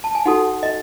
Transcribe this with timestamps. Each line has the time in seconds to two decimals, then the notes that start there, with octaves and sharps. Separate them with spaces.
0.04 A5
0.15 G#5
0.26 D#4 F#4 A4 F#5
0.63 D#5